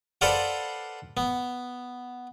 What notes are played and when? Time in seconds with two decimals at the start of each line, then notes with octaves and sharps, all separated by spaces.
0.21 A4 B4 C5 D5 F5 F#5
1.17 B3